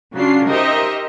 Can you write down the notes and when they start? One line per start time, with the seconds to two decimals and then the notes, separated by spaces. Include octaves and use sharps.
0.16 C#3 F#3 D4 F4 C7
0.49 D#4 G4 A#4 C5 D#5 E5